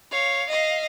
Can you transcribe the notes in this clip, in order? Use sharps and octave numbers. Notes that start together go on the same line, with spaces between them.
C#5 F5
D#5 F5